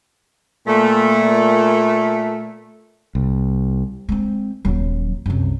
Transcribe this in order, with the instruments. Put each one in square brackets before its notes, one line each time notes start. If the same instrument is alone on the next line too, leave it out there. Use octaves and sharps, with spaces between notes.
[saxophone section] A#2 A3
[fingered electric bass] C2
[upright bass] G#3 C4
D#1 F#3
C2 F#2